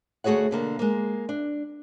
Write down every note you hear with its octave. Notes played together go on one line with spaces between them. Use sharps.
D2 A3 F#4 G#4 C#5 F#5
B2 D3 A#3
G#3 A#3
D4